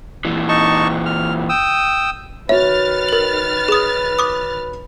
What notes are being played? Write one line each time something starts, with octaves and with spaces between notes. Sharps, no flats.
A#2 E3
D#4 A5 C#6
F6
G5 D#6 E6
D#3 F#4 B4 C#5 E5 F6 A6
A#4 F#7
G#4 D#6
D6 D#6